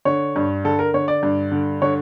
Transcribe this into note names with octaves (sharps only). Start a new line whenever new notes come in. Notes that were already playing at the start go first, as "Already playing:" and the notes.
D3 C#5
G2
D3 A4
A#4
D3 C#5
D5
G2
D3
D3 C#5